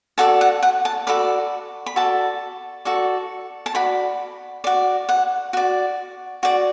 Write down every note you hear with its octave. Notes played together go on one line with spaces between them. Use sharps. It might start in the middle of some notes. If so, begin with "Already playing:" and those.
F#4 A4 D5 A5
F#5
F#5
A5
F#4 A4 D5 B5
B5
F#4 A4 D5 A5
F#4 A4 D5
A5
F#4 D5 B5
F#4 D5
F#5
F#4 D5
F#4 D5